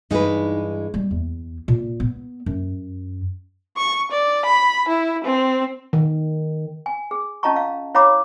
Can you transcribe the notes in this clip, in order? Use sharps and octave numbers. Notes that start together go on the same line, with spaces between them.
G2 E3 G#3 D#4 B4
G3
E2
A#2
B3
F#2
C#6
D5
B5
E4
C4
D#3
G#5
G#4
C#4 F4 D#5 A5 A#5 C#6
F5
E4 C#5 F5 A#5 B5 D6